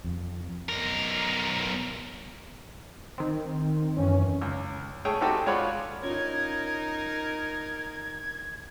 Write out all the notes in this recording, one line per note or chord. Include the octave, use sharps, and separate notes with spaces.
F2
B1 A#4
D#3 C4
F#2 E3 C#4
C#2
A3 G#4 C#5 G5
A3 C4 D#4 F#4 G4 A4
G#3 F4 C#5 D5 F#5 B5
C#4 D#4 F4 A#4 G#6
G#6